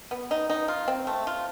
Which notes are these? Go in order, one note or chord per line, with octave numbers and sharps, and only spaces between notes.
B3
D#4
D#4
F4
C4
A3
F4